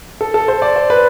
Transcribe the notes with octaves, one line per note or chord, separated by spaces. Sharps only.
A4
A4
C5
D5
C5
B4